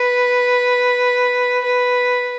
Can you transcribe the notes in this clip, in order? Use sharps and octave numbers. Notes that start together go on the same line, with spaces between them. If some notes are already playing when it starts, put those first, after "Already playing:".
Already playing: B4
B4